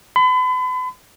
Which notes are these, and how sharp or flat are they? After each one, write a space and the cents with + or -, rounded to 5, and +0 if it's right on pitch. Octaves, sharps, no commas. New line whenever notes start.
B5 +40